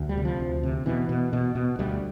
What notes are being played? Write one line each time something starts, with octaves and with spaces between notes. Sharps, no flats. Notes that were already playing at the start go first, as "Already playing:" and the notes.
Already playing: D2
G3
C3
F3
D2
C3
B2 E3
B2
B2
B2
D2 G3